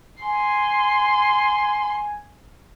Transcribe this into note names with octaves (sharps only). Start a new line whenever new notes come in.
G#5 C6